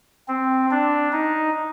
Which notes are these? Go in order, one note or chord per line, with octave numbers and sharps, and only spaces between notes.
C4
D4
D#4